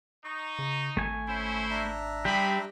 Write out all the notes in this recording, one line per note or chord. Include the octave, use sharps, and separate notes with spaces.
D#4 C#6
C#3
G#1 A3 G#5
C#4 E4 C5
D4 E5 A#5
G3 C4 G4 G#4 B5